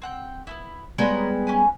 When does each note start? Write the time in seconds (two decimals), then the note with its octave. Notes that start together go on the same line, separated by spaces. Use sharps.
0.02 C4 F#5 G5
0.47 B3 C#4 E4
0.98 G3 G#3 B3 C#5 F#5 A#5
1.47 C#4 B4 G#5